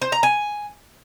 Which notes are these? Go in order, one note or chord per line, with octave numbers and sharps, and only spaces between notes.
C5
A#5
G#5